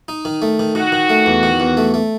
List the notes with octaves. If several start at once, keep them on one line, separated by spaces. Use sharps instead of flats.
D#4
D#3
A3
D#3
D#3 F#4
D#3
A3
E2
D#3
E2
A3
A3